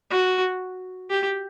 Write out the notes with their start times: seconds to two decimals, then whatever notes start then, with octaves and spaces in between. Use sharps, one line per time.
0.11 F#4
1.10 G4